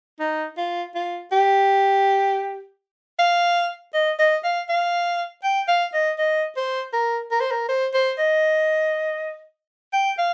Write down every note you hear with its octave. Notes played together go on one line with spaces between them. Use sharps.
D#4
F4
F4
G4
F5
D#5
D#5
F5
F5
G5
F5
D#5
D#5
C5
A#4
A#4
C5
A#4
C5
C5
D#5
G5
F5